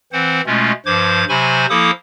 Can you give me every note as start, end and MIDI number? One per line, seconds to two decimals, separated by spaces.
0.13 0.41 52
0.13 0.41 60
0.13 0.41 72
0.13 0.41 78
0.46 0.72 47
0.46 0.72 56
0.46 0.72 57
0.46 0.72 61
0.46 0.72 65
0.86 1.24 43
0.86 1.24 53
0.86 1.24 72
0.86 1.24 86
0.86 1.24 92
1.29 1.66 48
1.29 1.66 54
1.29 1.66 72
1.29 1.66 80
1.29 1.66 83
1.29 1.66 85
1.70 1.91 53
1.70 1.91 58
1.70 1.91 64
1.70 1.91 69
1.70 1.91 86
1.70 1.91 87